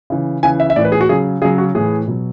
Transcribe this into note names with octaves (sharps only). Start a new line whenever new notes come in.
C#3 E3
C#3 E3 G#5
E5
E5
A2 E3 D5
B4
G#4
F#4
C#3 F#3 G#4
C#3 F#3 G#4
F#4
A2 E3 G#4
B2 F#3